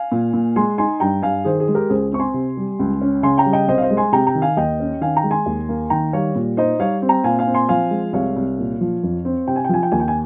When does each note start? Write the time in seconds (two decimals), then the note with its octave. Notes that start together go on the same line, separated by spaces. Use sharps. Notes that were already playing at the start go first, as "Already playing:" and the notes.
Already playing: F5 G#5
0.12 A#2
0.33 A#2
0.56 G#3 G#5 C6
0.78 D#4 G#5 C6
1.00 G2 G5 A#5
1.22 G2 F5 G#5
1.45 D#3 G#4 C5
1.60 G#4
1.68 G#3
1.75 G4 A#4
1.90 C#2 G#4 C5
2.12 C4 C#6
2.19 G#5 C6
2.34 C3
2.57 G3
2.80 C#2
3.02 C#4
3.23 C#3 G#5 C6
3.38 G5 A#5
3.46 G3
3.53 D#5 G5
3.68 C2 C5 D#5
3.78 F5
3.82 C5 D#5
3.91 G#3
3.97 G#5 C6
4.12 C3 G5 A#5
4.27 G5 A#5
4.35 D#3
4.42 F5 G#5
4.57 D#2 D#5 G5
4.80 C#4
5.01 D#3 F5 G#5
5.16 G5 A#5
5.24 G#3
5.31 G#5 C6
5.46 D#2
5.69 A#3
5.90 D#3 G5 A#5
6.13 G3 C#5 F5
6.35 A#2
6.57 D#4 C5 D#5
6.79 G3 C#5 F5
7.02 C4
7.09 G5 A#5
7.24 A#2 F5 G#5
7.39 F5 G#5
7.47 C4
7.54 G#5 C6
7.69 F3 F5 G#5
7.91 G#3
8.13 C2 C#5 F5
8.36 C2
8.59 A#2
8.81 F3
9.03 F2
9.25 C4
9.48 C3 G5
9.56 G#5
9.64 G5
9.69 F3 G#5
9.83 G5
9.92 D#2 G#5
10.00 G5
10.08 G#5